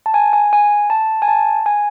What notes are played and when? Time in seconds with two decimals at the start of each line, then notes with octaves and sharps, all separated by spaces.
0.06 A5
0.14 G#5
0.33 G#5
0.53 G#5
0.90 A5
1.22 G#5
1.28 A5
1.66 G#5